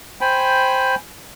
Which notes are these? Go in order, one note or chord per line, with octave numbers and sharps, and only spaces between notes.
C5 G5 G#5 B5